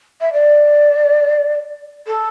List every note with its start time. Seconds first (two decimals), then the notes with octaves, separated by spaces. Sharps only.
0.21 E5
0.32 D5
2.07 A4